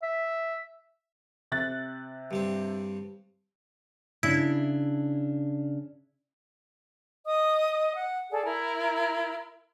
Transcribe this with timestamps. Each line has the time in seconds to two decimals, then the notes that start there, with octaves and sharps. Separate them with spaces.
0.03 E5
1.52 C3 F#6 A6
2.31 G2 G3 C4
4.23 C#3 D4 E4
7.25 D#5 D#6
7.95 F#5
8.30 G#4 A4 D5
8.44 E4 A#4